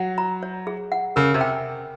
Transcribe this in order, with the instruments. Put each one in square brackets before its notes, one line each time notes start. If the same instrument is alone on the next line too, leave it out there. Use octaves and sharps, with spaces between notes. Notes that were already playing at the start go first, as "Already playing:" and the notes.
Already playing: [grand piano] F#3 [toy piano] F#5
[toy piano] A#5
C#5
G#4
F#5
[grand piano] C#3 [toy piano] A#4
[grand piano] C3
[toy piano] G5